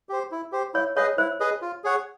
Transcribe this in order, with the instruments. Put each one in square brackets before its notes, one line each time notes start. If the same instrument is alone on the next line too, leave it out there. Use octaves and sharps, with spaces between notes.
[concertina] G4 C5
E4
G4 C5
[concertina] E4 [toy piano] C#5
[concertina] G#4 B4 D#5 [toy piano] C#5
[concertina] E4 [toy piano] C5
[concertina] G#4 B4 D#5
F4
G#4 C#5 F#5